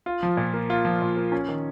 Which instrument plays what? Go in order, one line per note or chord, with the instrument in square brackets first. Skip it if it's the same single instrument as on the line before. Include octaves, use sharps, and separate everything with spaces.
[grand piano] F4
F3
A#2
A#3
F4
F3
A#2
A#3
C#4
D#3